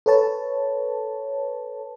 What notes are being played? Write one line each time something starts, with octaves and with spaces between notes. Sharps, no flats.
A4 B4 C#5 A5